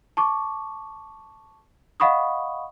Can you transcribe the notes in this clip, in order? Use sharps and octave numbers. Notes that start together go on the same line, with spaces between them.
A5 C#6 D6
D#5 F5 F#5 B5 C#6 D#6